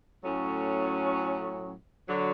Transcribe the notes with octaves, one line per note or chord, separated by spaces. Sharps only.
A2 F#3 A3 C#4
D3 F#3